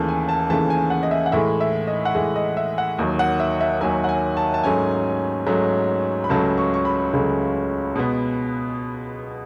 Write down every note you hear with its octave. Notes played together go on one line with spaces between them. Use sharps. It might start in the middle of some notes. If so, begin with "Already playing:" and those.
Already playing: D#2 C#3 E3 A3 A5
G#5
A5
D#2 C#3 E3 A3 A5
G#5
F#5
D#5
E5
F#5
A2 E3 G#3 E5
E5
D#5
F#5
A2 E3 G#3 E5
D#5
E5
F#5
D#2 D#3 F#3
F#5
E5
E5
D#2 D#3 F#3 G#5
F#5
G#5
A5
A5
G#2 F#3 A3 C#4 G#5
G#2 F#3 A3 C#4
B5
C#2 C#3 F#3 A3 A5
C#6
C#6
B5
C#2 C#3 F#3 A3
B2 G#3 B3